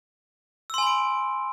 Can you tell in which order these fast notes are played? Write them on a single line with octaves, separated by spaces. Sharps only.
E6 C6 G#5 B5 D7